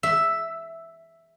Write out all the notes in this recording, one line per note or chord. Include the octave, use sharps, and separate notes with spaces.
E5